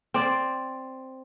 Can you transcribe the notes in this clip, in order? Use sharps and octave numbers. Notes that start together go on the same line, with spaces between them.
C4 D5